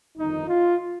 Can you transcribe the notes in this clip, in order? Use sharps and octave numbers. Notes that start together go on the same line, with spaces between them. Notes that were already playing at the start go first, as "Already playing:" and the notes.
G1 F2 D#3 D#4
F4